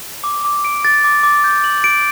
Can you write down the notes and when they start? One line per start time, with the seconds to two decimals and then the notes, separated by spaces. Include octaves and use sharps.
0.24 D6
0.45 D6
0.65 D7
0.85 A6
1.04 D6
1.23 D6
1.44 G6
1.64 F#7
1.84 D7